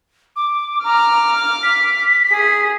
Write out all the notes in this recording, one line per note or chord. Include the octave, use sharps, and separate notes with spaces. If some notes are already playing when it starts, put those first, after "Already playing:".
D6
A#5 D6 F6
B6
G#4